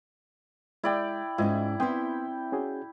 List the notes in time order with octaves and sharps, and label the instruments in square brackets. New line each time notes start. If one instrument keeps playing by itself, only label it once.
[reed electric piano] G#3 [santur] E4 D5 G5
[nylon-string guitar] G#2 C#4 [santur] E4 [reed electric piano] F4 D#5
[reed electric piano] B3 C6 D#6 [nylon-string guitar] C4 E4 [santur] G5
[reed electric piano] C#4 F#4 G#4